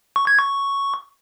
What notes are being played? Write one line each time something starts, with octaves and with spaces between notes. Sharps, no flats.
C#6
G#6
C#6